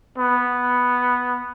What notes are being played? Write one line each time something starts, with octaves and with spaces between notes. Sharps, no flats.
B3